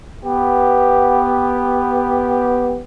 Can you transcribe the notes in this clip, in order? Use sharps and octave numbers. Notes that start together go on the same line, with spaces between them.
B3 G4